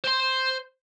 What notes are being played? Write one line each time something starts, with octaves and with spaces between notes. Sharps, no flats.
C5 C6